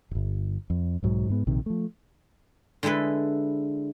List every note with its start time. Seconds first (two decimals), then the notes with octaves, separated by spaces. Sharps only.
0.11 D1 G1
0.70 F2
1.03 B1 G#2 F#3
1.30 G#2 G#3 B3
1.47 A#1 C3 D#3
1.66 F3 A3
2.83 D3 G#3 E4 A4 B4